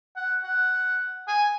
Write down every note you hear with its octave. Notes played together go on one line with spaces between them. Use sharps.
F#5
F#5
G#5